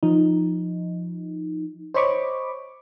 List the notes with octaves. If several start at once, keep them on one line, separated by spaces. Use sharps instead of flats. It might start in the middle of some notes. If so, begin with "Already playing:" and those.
F3 D#4
C5 C#5 D#5 B5 C#6 D6